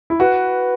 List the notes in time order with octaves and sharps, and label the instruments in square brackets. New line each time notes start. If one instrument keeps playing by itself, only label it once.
[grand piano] E4
[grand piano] F#4 [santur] B4